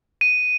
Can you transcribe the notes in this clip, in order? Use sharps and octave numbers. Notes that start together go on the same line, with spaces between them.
D#7